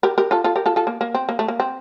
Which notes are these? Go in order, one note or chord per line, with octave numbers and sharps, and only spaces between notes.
G4 A#4
G4 A#4
F4 A4
F4 A4
G4 A#4
F4 A4
F4 A4
A#3
A#3
C4
A#3
A3
A#3
C4